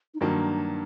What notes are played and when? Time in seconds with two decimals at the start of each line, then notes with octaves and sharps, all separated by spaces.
0.14 D#4
0.21 G2 D#3 F#3 A#3 D4